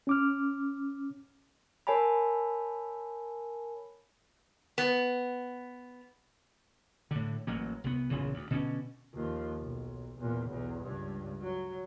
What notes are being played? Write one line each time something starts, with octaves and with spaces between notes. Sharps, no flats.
C#4 D6 F6
A#4 C#5 G#5 A5 B5
B3
A2 D3
A1 F#3 A#3
C2 B3
A#1 E2 C#3 E3
D2
B2 D3 C#4
D#2 F3
B1
E2 A#2
B1 E2
C#2 G2
F#3